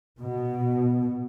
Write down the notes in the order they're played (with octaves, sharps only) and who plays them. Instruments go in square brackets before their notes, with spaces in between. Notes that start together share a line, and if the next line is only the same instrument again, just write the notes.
[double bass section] B2